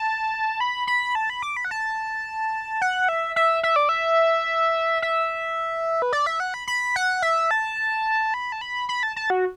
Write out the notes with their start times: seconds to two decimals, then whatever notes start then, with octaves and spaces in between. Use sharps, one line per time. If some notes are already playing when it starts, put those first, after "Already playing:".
Already playing: A5
0.60 B5
0.87 B5
1.15 A5
1.30 B5
1.42 D6
1.57 B5
1.65 F#5
1.71 A5
2.82 F#5
3.09 E5
3.36 E5
3.63 E5
3.76 D5
3.89 E5
5.02 E5
6.02 B4
6.13 D5
6.26 E5
6.40 F#5
6.54 B5
6.67 B5
6.96 F#5
7.22 E5
7.51 A5
8.34 B5
8.52 A5
8.61 B5
8.89 B5
9.03 A5
9.16 A5
9.30 F#4